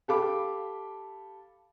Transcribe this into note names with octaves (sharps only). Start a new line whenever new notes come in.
G4 A4 F5 B5 D6